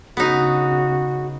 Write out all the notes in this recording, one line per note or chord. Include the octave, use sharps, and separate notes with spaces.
C#3 B3 D#4 F#4